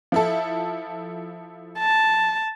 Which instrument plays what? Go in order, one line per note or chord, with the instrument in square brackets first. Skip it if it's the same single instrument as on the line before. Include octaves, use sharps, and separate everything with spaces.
[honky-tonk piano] F3 E4 A4
[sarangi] A5